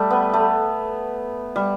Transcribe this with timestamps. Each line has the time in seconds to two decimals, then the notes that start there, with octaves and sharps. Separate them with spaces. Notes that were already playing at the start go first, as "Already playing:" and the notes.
Already playing: G3 A3
0.10 B3
0.33 A3
1.56 G3